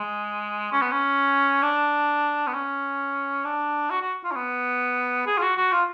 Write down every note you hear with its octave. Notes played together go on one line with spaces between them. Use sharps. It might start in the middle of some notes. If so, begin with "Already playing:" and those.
Already playing: G#3
C#4
B3
C#4
D4
B3
C#4
D4
F#4
F#4
F4
C#4
B3
G#4
F4
F#4
F#4
F4